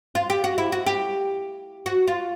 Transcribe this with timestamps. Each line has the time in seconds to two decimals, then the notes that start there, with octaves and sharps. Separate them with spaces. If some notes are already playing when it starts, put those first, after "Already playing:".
0.15 F4
0.30 G4
0.44 F#4
0.58 E4
0.72 F#4
0.86 G4
1.86 F#4
2.07 F4